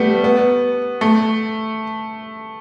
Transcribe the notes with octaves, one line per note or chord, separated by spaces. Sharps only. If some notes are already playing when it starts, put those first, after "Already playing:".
Already playing: G3 A3 B3
B3
A3